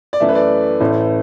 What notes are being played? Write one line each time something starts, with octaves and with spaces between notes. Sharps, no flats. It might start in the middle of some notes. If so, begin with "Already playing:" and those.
D5
F#2 E3 A3 E5
B4
D5
A1 A2 A3